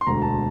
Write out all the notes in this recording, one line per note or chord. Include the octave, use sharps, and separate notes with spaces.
C6
E1 D2 D3 A#5
A5